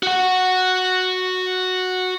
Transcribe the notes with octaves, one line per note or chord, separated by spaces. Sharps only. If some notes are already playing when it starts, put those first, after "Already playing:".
F#4 F#5